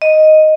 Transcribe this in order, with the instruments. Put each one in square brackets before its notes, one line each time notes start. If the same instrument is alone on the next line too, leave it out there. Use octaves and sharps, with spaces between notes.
[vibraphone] D#5